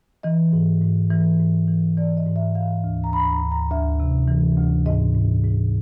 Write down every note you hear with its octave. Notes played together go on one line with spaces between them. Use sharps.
E3 D#5
G#2
G#2
E3
G#2
E3
E3 D5
D#5
G#2
E5
E3 F5
D2
A#5
D2 B5
A#5
D2
A#5
D2 E5
C3
E3
D2
G#2 D#5
G#2
G#2